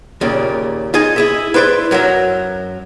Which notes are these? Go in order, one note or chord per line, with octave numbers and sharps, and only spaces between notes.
D#2 A#2 C#3
D#4 F4 G#4 D#5 G#5
E4 G#4 E5
E4 B4 C5 D5 E5
F#2 F#3 A#4 E5